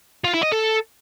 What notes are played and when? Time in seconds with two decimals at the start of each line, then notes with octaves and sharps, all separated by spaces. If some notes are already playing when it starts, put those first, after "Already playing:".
0.24 F4
0.34 E4
0.43 D#5
0.52 A4